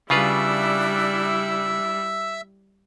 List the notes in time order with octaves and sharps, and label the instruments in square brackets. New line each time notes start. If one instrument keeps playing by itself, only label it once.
[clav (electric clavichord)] C#3 F4 B4 [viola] G3 E4 [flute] D4 [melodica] E5 E6